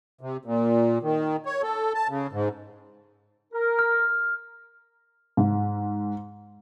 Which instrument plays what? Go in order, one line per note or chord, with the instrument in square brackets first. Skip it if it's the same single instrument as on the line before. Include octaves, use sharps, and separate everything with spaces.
[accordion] C3
A#2
D#3
C#5
A4
A5
C#3
G#2
[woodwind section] A#4
[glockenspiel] F6
[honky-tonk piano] G#2